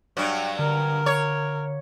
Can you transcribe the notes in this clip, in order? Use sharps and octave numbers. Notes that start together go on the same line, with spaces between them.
G2 F#3
D3 A#4
C#5